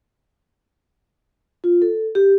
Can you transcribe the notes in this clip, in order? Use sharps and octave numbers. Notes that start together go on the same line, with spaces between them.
F4
A4
G4